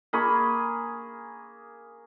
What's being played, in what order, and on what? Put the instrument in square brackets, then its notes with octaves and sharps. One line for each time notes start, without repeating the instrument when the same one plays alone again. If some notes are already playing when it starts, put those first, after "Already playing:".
[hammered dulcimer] A#3 G#4 B5 C#6